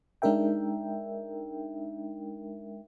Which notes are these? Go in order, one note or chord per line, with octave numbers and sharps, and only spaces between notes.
G#3 D4 D#4 A#4 E5 G5